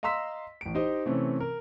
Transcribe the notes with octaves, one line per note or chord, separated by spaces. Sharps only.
D#5 F5 A#5 C6 E6 B6
A1 D7
D#4 G4 C5 D#5
C3 E3 A3 C4 C#4
A#4